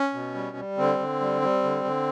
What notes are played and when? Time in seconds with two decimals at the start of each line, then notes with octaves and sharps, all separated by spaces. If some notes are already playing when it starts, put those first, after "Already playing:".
Already playing: C#4
0.14 B2
0.34 G3
0.57 G3
0.78 D3 C4
0.99 D3
1.20 G3
1.42 G3
1.64 D3
1.84 D3